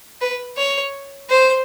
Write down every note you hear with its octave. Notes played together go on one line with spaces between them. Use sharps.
B4
C#5
C5